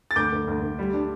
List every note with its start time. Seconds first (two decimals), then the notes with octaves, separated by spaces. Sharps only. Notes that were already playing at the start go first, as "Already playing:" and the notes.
0.11 A6
0.16 D2 D6 G6
0.32 D2
0.47 D2
0.62 D2
0.79 G3
0.93 D4